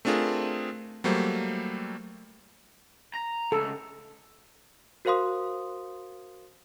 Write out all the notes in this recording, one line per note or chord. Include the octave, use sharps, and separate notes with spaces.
A3 C4 D4 F4 G#4 A#4
F#3 G3 A3 A#3 C5
A#5
C#2 A4
F#4 A#4 C5 F5 C6 D#6